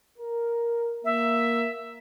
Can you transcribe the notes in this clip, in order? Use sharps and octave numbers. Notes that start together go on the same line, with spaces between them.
A#4
A#3 E5